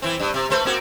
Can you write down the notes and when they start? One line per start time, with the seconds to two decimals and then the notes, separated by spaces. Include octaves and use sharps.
0.02 E3 C4
0.20 G2
0.34 C3
0.50 A3 B4 C5
0.65 A#3 C4 F#4